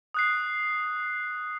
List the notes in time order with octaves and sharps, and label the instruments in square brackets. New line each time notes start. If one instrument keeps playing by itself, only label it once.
[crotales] D#6 F#6 C7